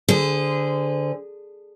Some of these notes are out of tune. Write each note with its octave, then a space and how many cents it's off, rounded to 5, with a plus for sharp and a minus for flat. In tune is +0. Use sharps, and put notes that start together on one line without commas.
D3 +0 G#4 -15 C5 -25